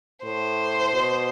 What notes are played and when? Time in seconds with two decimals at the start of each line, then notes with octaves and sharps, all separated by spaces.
0.24 A2 C5
0.94 B2